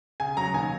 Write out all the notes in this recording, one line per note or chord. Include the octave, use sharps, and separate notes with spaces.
C#3 G#5
F#3 A#5
D#2 G#5